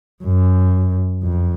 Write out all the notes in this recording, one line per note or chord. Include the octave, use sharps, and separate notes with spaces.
F#2
F2